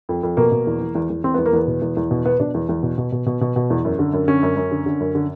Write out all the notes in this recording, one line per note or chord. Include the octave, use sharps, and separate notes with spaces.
F2
F2
B2 A#3
B2
E2
E2
E2
E2
E2 C4
E2 B3
A#3
E2 B3
B2
E2
E2
B2
B2 B3
B2 D4
E2
E2
B2
B2
B2
B2
B2
B2
E2
F#2
D3
F#2
D3 C#4
F#2
F#2
D3
D3
F#2
D3